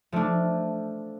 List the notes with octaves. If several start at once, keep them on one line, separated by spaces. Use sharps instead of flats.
F3 A3 D4